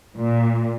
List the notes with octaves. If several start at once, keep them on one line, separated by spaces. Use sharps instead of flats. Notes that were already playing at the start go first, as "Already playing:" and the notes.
A#2